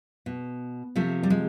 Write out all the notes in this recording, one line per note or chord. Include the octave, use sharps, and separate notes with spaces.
B2
C3 F3 A3
G3
G#3